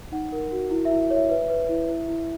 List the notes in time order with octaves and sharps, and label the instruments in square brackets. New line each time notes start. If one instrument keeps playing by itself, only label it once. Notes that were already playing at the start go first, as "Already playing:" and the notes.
[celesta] D#4 F#5
A#4
F#4
E4
E5
E4
E5
C#5
E5
B4 E5
B4
E4
E4
E4